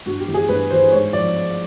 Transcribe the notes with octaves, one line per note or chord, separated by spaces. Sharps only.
G2 F#4
G4
E3 G3
G#4
G2 B4
E3 G3 C5
G#2 C#5
F3 D5